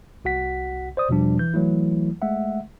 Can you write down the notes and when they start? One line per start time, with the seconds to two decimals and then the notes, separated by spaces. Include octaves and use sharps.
0.25 C2 F#4 F#5 B6
0.97 C5 D5 D#6
1.09 E2 B2 F3 G3 D4
1.39 E3 G6
1.54 E3 F#3 A3 E4
2.22 G#3 A3 E5 F#5